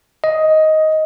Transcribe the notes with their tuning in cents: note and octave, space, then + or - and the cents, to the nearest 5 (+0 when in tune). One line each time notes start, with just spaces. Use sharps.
D#5 +10